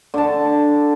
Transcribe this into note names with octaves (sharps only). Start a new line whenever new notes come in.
D3 A5